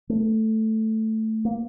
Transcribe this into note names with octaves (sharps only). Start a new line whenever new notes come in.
A3
A#3